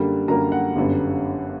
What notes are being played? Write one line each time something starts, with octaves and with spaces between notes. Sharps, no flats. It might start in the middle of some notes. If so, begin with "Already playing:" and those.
Already playing: F#2 D3 G3 A#3
F#2 D3 G3 A#3 A#5
F#5
G1 F#2 D3 G3 B3